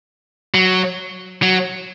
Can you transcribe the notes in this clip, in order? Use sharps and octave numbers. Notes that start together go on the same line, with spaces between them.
F#3
F#3